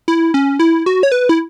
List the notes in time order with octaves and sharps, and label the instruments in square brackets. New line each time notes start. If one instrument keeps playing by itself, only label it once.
[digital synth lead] E4
C#4
E4
F#4
C#5
B4
E4